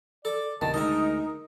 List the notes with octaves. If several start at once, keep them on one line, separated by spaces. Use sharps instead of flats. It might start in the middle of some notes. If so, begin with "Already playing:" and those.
A4 D5
C2 G2 B2 D#3 A5
D2 E3 G#3 D#4 A#4 D#5 E5